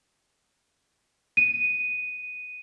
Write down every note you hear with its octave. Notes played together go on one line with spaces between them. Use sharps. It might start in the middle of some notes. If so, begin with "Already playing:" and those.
D#7